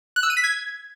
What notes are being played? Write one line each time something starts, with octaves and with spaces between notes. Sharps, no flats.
F#6
E6
D#7
B6
G#6